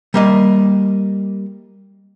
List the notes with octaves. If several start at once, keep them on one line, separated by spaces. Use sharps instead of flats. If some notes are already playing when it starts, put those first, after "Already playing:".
G3 A#3 D#5